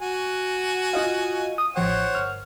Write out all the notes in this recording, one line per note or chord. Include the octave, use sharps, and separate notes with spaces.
F#4 G#5
F4 D#5 F5
D#6
A1 F3 C5 C#5 F#5 G5
G1 F6